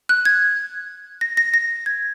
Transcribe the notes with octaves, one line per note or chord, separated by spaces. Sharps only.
F#6
G#6
A#6
A#6
A#6
G#6